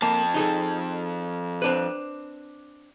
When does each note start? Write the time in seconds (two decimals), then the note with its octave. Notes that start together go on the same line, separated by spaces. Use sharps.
0.02 F2 A#3 A5
0.34 D#4 G#4 A4
1.62 C4 D4 B4